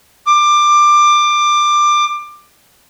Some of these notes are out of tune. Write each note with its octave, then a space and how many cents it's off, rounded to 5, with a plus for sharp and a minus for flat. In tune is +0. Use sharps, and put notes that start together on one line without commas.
D6 +20